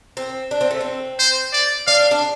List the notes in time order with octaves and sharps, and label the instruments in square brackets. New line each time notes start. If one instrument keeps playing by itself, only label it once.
[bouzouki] C4
D4
C4
A3
C4
[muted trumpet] C5
D5
[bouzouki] D4 [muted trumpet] F5
[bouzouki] D4